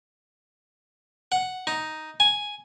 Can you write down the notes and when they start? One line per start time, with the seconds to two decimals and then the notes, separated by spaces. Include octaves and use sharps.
1.32 F#5
1.67 D#4
2.20 G#5